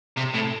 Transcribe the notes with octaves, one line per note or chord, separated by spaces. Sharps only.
C3
A2